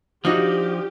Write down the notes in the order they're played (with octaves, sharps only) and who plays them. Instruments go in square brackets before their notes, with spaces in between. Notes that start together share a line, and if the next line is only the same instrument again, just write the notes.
[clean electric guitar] F3 [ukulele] D4 D#4 F#4 [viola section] G4